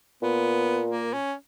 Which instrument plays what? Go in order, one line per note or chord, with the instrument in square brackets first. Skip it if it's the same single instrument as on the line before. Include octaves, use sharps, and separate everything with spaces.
[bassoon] A#2 [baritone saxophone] B3
[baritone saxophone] A#3
C#4